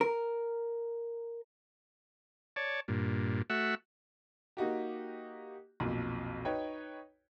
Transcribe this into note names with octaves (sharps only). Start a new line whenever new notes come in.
A#4
C#5 D5 A5
G2 A#2
A3 F#4 E5 F#5 E6
A#3 D#4 F#4 G4
B1 F2 A#2
D#4 B4 C#5 G5